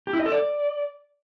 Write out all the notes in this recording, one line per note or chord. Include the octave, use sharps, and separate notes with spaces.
G4
E4
D#5
A4
D5